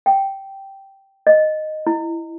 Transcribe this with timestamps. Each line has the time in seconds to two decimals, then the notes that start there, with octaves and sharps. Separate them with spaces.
0.06 G5
1.27 D#5
1.87 E4